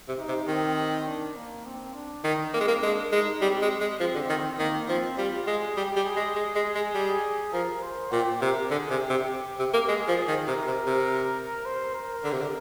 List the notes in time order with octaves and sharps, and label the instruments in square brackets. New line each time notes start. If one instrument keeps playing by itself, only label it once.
[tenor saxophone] C3
[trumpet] D#4
[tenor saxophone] C3
[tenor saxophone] D#3 [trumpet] C4
[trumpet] D4
A#3
C4
D4
[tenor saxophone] D#3 [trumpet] D#4
[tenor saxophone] A#3 [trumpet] C4
[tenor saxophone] G#3
A#3
[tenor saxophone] G#3 [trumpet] D4
[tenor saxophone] G#3 [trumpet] D#4
[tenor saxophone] G3 [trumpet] C4
[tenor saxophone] G#3
G#3
[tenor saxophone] F3 [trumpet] C4
[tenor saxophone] D3
D#3
[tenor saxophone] D#3 [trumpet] A#3
[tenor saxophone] F3 [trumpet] C4
[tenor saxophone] G3 [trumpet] F4
[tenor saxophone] G#3 [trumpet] G#4
[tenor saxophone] G3 [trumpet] G4
[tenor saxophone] G3
[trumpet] G#4
[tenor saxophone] G#3
G#3
G#3
G#3
G3
[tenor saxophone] F3 [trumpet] A#4
[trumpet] C5
[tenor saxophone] A#2 [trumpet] G5
[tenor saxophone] C3 [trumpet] A#4
[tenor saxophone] D3 [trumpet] G#4
[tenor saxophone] C3
[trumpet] G4
[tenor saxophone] C3
C3
A#3
[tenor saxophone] G#3 [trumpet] G#4
[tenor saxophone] F3
[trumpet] G#4
[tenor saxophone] D#3
[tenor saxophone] C3 [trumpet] A#4
[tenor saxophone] C3
C3
[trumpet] C5
A#4
[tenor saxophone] D3
C3
D3